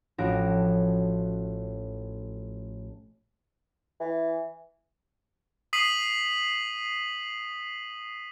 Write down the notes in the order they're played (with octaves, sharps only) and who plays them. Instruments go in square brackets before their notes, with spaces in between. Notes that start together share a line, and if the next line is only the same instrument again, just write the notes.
[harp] A1 F3 F#4 A#6 D7
[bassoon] E3
[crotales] D#6 B6 C7 D#7 F#7